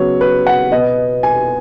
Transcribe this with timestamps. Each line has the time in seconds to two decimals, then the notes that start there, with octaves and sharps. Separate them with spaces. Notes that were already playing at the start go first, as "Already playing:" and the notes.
Already playing: C#3 F#3 B3 C#5
0.21 B4
0.47 F#5
0.72 B2 B3 D#5
1.23 G#5